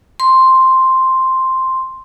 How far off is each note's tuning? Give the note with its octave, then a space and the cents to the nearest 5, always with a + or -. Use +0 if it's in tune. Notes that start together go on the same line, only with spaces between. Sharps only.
C6 +0